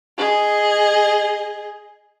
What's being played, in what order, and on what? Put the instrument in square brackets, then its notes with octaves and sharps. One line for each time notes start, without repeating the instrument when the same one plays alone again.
[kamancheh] G#4 D#5